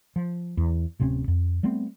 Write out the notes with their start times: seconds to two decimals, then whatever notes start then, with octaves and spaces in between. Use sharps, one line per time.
0.16 F3
0.57 E2
0.99 D1 C3 C4 C#4
1.28 F2
1.63 G3 A3 B3 C4